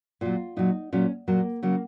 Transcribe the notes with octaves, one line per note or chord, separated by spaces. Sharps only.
A#2 F#3 F4
A#2 F#3 D#4
A#2 F#3 C#4
A#2 F#3 A#3
C#3 F#3 A#3